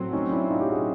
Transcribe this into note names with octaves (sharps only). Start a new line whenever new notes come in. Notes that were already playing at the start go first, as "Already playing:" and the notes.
Already playing: A2 F#3 A3 C4
C#4 D#4
D4 E4
D#4 F4
G4
F#4 G#4